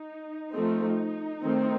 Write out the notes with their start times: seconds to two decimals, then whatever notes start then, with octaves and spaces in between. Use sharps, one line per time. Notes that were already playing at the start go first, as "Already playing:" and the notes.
Already playing: D#4
0.53 F3 A3 C4
1.44 D#3 A3 C4